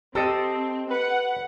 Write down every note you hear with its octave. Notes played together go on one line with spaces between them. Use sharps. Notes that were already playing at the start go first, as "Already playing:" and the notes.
C4 G4 A4 C5 D#5
B4 F#5